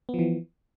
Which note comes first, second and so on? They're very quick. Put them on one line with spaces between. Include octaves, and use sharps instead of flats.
B3 F3 E3